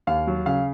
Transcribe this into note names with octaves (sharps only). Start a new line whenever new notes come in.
D#2 F5
F#3
C#3 F5